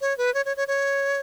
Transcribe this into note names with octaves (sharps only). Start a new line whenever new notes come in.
C#5
B4
C#5
C#5
C#5
C#5